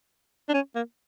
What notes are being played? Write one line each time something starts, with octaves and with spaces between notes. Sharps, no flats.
D4
C#4
A#3